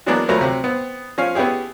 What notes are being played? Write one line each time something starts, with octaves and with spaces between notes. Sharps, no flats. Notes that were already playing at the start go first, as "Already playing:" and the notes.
E3 F#3 G#3 A#3 B3 D4
D2 F3 F#3 A3 B4 A#5
C3 F#3
B3 C4
F3 C#4 F5
B3 C#4 E4 G4 G#4